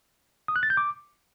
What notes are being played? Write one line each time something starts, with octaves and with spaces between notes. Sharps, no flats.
D#6
F#6
A6
G6
D6